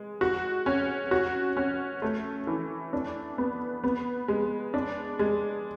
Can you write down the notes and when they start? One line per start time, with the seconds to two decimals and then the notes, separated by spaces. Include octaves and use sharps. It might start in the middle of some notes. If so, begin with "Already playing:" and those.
Already playing: G#3
0.21 F#4
0.66 C#4
1.11 F#4
1.57 C#4
2.02 A3
2.47 E3
2.93 D4
3.38 B3
3.84 B3
4.28 G#3
4.74 D4
5.19 G#3